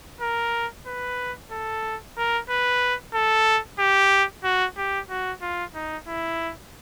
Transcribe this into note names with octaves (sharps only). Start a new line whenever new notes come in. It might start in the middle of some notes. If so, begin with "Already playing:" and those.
A#4
B4
A4
A#4
B4
A4
G4
F#4
G4
F#4
F4
D#4
E4